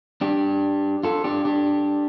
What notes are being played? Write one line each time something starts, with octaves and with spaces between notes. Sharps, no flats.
D4 G4
F4 A4
D4 G4
D4 G4